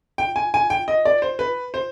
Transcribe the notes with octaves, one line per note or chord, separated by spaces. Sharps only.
G5
G#5
G#5
G5
D#5
D5
C5
B4
C5